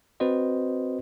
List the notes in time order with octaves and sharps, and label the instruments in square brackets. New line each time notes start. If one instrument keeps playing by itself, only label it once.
[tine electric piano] C4 F#4 B4 C5 D#5